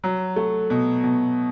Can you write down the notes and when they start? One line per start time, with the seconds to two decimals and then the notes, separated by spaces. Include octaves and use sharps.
0.04 F#3
0.36 A3
0.70 B2
1.04 B2